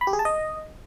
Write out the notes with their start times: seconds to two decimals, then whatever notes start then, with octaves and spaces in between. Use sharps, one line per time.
0.01 B5
0.07 G4
0.13 G#4
0.19 A5
0.25 D#5